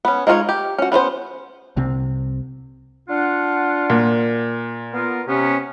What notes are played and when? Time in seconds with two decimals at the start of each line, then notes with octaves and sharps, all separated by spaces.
0.05 B3 C#4
0.27 G#3 D#4 F4 G#4 C#5
0.49 G4
0.78 C#4 F#4
0.92 B3 C#4 B4 C5
1.77 C2 C3 C4
3.09 D4 F4 F#5
3.90 A#2
4.93 B3 F4 A#4
5.27 C3 B3 C#4